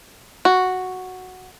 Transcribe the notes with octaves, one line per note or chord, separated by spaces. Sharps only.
F#4